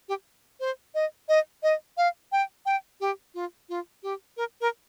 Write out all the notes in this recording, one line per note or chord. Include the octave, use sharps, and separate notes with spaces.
G4
C5
D#5
D#5
D#5
F5
G5
G5
G4
F4
F4
G4
A#4
A#4